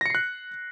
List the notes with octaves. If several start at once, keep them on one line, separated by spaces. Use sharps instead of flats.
F#6 A#6 C7 C#7